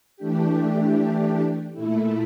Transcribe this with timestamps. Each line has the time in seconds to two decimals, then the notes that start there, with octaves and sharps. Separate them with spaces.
0.17 E3 A3 D4 G4
1.73 A#2 A3 E4